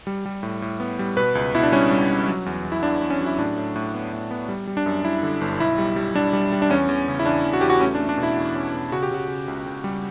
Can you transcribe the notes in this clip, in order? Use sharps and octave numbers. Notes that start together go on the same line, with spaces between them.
G3
G3
A2
A2
B3
G3
B2 B4
C#2
B2 E4
D4
G3 C#4
G3
C#2
F#3
E2
E2
E4
E2 D4
E2
C#4
F#3
E4
A2 D4
A2
A2
B3
A2
B3
G3
G3
D4
F#2
G3 E4
D3
G1
B1 E4
G3
G3
G3 D4
G3
G3
D4
E2 C#4
E2
C#3
E4
E2 D4
E2
F#4
E2 G4
F#4
A3 C#4
D4
A3
D4
B2
E4
E2
C#4
B2
C#3 F#4
G4
C#3 F#4
C#3
C#2
C#2
G3